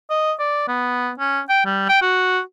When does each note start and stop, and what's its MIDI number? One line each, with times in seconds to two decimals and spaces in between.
0.10 0.33 75
0.40 0.67 74
0.68 1.10 59
1.20 1.40 61
1.49 1.62 79
1.66 1.88 55
1.89 2.00 79
2.02 2.40 66